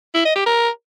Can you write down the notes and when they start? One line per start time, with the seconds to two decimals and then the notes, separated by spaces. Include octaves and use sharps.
0.15 E4
0.25 D#5
0.36 G4
0.46 A#4